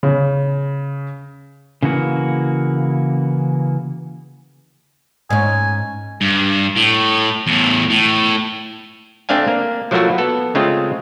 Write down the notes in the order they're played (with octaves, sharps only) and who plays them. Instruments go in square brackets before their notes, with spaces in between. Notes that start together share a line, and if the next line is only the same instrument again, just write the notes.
[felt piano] C#3
[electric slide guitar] C#3 E3 A#3 F#4
[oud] G#2 C#4 [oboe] G#5
[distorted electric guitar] G2
A2
E2 A2
A2
[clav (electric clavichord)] A3 C4 D4 F5 G#5
A#3
F3 F#3 A3 A#3 E4 F#4
B3 A4
C#3 G#3 A3 C4 F4